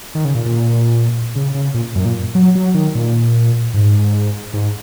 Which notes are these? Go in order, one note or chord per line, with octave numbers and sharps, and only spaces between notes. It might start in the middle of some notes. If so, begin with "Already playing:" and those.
D#3
C#3
A#2
A#2
C#3
C#3
A#2
F#2
A#2
F#3
F#3
D#3
A#2
G#2
G#2